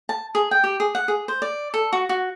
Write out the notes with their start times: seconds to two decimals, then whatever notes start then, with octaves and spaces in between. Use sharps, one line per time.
0.09 A5
0.35 G#4
0.51 G5
0.64 G4
0.80 G#4
0.95 F#5
1.08 G#4
1.28 C5
1.42 D5
1.74 A4
1.93 F#4
2.09 F#4